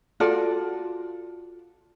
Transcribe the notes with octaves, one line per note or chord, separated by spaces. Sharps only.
F4 F#4 A4 D5